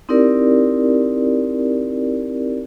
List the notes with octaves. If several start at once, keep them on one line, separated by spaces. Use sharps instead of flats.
C4 D#4 E4 G4 A#4 D5